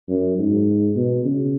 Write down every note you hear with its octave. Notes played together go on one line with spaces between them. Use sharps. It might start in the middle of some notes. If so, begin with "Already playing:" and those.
F#2
G#2
B2
C#3